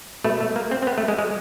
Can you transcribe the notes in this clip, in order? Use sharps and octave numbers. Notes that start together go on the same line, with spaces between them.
B2 A3
A3
A#3
C4
C4
B3
A3
G#3
G#3